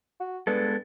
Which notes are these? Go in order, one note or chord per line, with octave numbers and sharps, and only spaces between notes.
F#4
G2 G#3 B3 A4